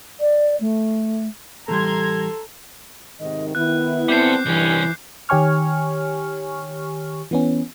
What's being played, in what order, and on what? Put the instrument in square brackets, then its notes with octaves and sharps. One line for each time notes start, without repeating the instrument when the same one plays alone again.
[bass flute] D5
A3
[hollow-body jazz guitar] A2 E3 G3 [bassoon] A4 [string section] A#5 C6 G#6
[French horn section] G#2 C3 D#3 [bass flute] D#5
[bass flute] D#3 [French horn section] B3 E4 [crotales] F#6
[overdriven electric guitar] G3 A4 [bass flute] C4 [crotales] D6 G6 C7
[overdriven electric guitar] C2 C#4 [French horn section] G2 G3 [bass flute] E3
[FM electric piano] D#3 G4 C#5 G#5 C#6 F6
E3 B3 C#4